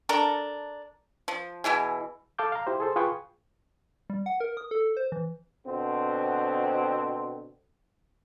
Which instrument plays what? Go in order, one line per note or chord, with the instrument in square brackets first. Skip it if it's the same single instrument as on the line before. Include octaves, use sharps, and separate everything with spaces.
[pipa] D4 A4 A#4 A#5
F3
B2 E3 E4 G#4
[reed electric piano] A4 F5 A5 D6 G6
F5 A#5
E4 G4 C5
G#4 A4 C5
F4 G#4 B4 F5 G5 C#6
[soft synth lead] G3
F#5
A#4
D#6
A4
C5
E3
[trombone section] B2 D3 C4